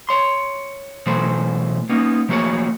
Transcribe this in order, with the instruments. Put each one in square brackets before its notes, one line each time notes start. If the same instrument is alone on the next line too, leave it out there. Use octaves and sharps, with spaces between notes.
[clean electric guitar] C#5 C6
B2 E3 F#3 A3 C5
A#3 B3 C#4 D#4
F3 A3 A#3 F#4 G#4 C#5